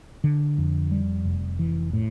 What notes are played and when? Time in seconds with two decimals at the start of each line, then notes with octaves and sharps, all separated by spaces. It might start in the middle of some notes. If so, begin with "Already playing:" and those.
0.24 D3
0.58 F2
0.92 G3
1.25 F1
1.59 E3
1.93 A2